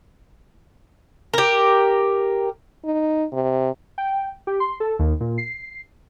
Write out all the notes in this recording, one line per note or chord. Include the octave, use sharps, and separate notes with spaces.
G4 A#4
D#4
C3
G5
G4
C6
A4
D#2
A#2
C7